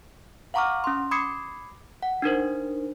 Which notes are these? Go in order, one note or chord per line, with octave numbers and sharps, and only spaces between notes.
F5 F#5 A#5 C#6 D6 F6
C#4 C6
B5 D6 D#6 G#6 C7 C#7
F#5
D4 D#4 A#4 C5